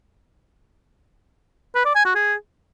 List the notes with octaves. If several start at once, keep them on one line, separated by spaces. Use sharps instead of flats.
B4
D5
G#5
F#4
G#4